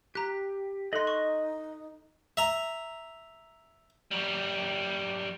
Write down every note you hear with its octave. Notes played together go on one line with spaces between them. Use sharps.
G4 A#5 F#6
D#4 A4 D#5 C6 F#6
C#6
E5 A#5
F#2 G3